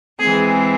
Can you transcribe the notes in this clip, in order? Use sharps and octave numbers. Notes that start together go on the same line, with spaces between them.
E3 G#3 C4 G#4